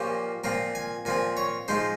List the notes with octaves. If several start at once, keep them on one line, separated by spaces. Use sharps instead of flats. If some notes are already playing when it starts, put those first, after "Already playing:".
Already playing: A#2 F3 A#3 C#4 G4
A#2 F3 C4 A#4
G#5
A#2 F3 C4 G#5
C#5
F3 G#3 D#4 C5